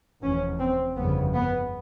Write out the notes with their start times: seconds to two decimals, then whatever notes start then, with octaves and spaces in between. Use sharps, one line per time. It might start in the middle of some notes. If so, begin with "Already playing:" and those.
0.22 F1 E2 B2 C#4
0.59 C4
0.96 G1 F2 C#3 B3
1.33 B3